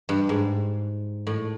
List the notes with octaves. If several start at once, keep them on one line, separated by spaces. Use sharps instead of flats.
G2
G#2
A2